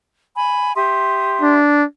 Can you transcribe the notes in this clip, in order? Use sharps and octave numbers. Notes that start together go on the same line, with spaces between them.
G#5 B5
G4 E5 C6 D#6
D4